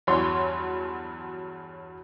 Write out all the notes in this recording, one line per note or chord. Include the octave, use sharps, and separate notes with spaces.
E2 G2 F#3 C#5 C6